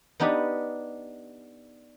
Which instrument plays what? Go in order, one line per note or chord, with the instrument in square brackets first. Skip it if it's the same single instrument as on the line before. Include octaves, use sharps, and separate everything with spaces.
[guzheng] B3 D4 D#4 G4 B5